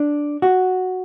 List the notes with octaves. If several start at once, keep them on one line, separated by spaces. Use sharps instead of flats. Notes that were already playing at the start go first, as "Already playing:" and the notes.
Already playing: D4
F#4